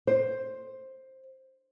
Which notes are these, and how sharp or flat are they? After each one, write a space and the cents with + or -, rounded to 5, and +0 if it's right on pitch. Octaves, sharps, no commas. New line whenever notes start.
C5 +10